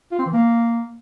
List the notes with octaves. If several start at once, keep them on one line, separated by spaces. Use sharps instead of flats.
F4
C4
E3
A#3